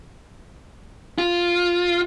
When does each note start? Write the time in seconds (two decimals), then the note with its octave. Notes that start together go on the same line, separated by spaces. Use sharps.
1.18 F4